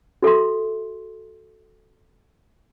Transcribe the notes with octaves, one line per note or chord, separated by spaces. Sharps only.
F#4 A4 E5 C6